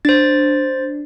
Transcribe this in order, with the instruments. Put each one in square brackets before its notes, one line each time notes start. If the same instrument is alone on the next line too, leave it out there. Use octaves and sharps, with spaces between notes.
[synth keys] D4 [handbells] C5 A6